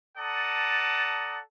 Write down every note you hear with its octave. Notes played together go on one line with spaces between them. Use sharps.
A4 D5 F#5 A5 A#5 D#6